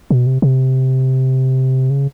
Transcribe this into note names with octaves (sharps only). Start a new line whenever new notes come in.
B2
C3
C3
C#3